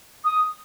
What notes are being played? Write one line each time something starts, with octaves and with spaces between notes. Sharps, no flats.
D#6